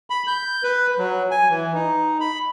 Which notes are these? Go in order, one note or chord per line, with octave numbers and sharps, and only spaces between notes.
B5
G6
B4
F#3
G#5
E3
D#4
B5